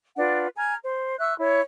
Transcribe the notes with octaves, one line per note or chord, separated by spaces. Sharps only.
D4 F4 B4 F#5
G#5 A#5 F6 G#6
C5
E5 C#6 E6 F#6
E4 C#5